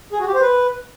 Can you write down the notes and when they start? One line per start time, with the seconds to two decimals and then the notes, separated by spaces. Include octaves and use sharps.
0.13 G#4
0.20 F#4
0.27 G4
0.34 C5
0.42 B4